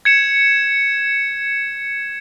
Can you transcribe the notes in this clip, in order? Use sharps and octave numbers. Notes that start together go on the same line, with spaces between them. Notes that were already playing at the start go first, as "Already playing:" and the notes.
G#6 C#7 E7